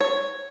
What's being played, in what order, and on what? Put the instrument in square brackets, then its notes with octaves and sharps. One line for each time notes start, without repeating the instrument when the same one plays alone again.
[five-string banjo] C#5